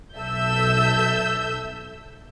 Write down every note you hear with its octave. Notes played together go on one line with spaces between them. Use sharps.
B1 A4 E5 E6 G6